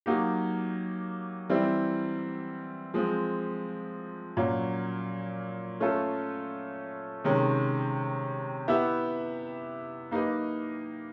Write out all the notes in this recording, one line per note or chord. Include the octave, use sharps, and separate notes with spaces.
F#3 A#3 D#4 G4
E3 G3 C4 E4
F3 G#3 C4
A#2 F#3 A#3 C#4
A3 C#4 F4 A4
C3 D#3 G#3 C#4
B3 E4 G4 B4 E5
A#3 D#4 G4 B4 D#5